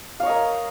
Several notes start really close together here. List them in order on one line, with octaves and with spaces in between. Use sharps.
F5 C#5 D#5 A#4